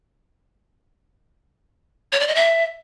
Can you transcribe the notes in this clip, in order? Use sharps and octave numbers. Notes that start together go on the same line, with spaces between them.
C#5
D5
D#5
E5